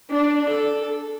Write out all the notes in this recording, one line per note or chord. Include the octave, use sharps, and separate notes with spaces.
D4
A4